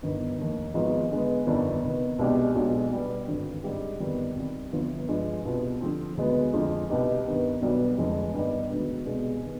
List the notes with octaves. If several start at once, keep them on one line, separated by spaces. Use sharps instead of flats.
G1 G2 D#3 B3
F1 D#2 D#3
G#1 G#2 F3 G#3 B3
D3 G#3 B3
G1 F2 D#3 B3 D4
C3 D#3 B3
C2 B2 G#3 D4 G4
B1 B2 G#3 D4
B2 G3 B3
G#1 G2 D3
G#2 G3 C4 G4
G1 F2 D#3 G3 B3
C2 C3 D#3 G3
G1 G2 F3 B3 F4
G2 F3 G#3 D4
C2 B2 B3 F4
D3 F3 C4
D2 D3 G#3 B3
F2 D3 F3 G#3
C2 B2 B3 D#4 G4
G2 D#3 B3
B1 B2 G3 B3 D4
F1 F2 D3 G#3
G2 D#3 G3 B3 D#4
D2 D3 G#3 B3
C2 B2 G#3 D4 G#4
D#3 B3